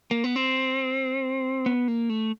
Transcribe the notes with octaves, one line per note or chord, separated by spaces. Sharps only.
A#3
B3
C4
B3
A#3
A3